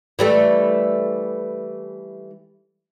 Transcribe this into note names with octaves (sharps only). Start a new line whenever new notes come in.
E3 G3 A3